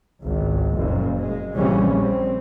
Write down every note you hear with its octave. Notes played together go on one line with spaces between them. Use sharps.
G#1 C#2
F#1 F2 A#2
G#3
A#1 C#3 E3 G3 C4 C#4
C4